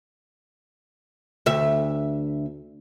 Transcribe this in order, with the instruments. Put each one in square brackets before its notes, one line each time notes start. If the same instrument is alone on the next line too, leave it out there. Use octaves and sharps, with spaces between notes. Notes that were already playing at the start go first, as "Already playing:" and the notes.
[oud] D2 E5